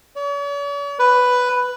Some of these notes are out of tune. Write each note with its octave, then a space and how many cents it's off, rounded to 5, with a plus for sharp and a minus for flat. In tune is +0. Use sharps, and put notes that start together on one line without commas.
C#5 +45
B4 +5